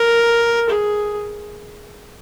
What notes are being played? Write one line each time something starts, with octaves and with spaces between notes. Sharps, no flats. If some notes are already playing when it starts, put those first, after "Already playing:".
Already playing: A#4
G#4